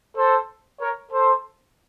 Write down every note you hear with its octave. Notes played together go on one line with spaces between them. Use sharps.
A4 C5
A#4 C#5
A4 C5